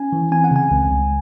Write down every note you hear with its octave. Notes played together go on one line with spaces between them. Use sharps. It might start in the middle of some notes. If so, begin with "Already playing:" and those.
Already playing: C#4 G#5
E3
C4 G#5
F#5
C#3 G#5
C#2
C#2